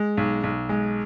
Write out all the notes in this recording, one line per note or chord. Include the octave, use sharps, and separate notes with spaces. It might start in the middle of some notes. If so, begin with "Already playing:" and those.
Already playing: G#3
B1
B1
G#3